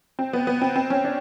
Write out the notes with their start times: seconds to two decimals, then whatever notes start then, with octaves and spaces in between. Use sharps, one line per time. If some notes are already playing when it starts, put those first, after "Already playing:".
0.19 C4
0.33 B3
0.47 B3
0.61 C4
0.76 C4
0.90 C#4
1.04 D4